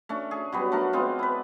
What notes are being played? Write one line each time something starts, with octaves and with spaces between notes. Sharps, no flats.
A3 C#4 D4
G#4
F#3 G3 B3
A3 D4 A#4
G#3 B3 C4 F4
E4 B4